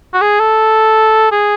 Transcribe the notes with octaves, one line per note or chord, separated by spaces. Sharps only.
F#4
G#4
A4
G#4